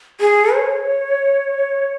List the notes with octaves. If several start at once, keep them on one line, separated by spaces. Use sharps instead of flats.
G#4
C#5